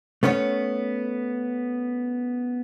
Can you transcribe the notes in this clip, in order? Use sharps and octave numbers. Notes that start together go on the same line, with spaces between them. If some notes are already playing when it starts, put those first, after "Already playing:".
A3 B3 C#4 C#5